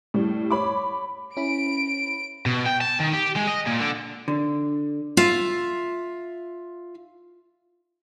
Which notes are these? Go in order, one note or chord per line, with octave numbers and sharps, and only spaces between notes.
A2 G3
C#5 B5 D6
C#4 E4 B5 D7
B2
G5
A5
D#3
G4
G#3
D#5
A#2
D3
D3
F4 E5